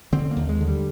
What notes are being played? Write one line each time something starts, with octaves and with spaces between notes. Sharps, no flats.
D3 C4
A#3
D#2
G#3
D3
G3